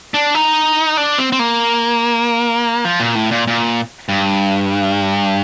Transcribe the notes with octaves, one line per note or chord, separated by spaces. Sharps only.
D4
D#4
D4
C4
C4
A#3
F3
A#2
A2
A#2
A#2
G2